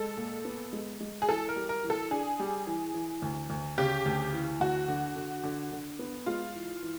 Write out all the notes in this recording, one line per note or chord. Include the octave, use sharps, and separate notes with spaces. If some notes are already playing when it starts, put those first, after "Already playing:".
Already playing: G#3 A4
A#2
B3
G#3
G#3
G#4
E3 A4
A#4
G3
A#4
E3
A4
D4 G#4
G3
E3
E3
D2
D2
C#3 G4
D2
E3
D2 F#4
D3
D3
D3
D3
B3
G#3 F4
E3
E3